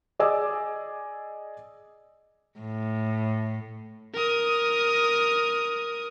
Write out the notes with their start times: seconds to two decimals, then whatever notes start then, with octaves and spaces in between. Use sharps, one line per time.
0.19 G#4 D5 D#5 G#5 D6 E6
2.59 A2
4.14 A#4 D#6